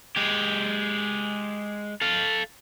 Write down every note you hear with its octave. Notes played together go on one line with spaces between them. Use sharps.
G#3 G4
A4 F5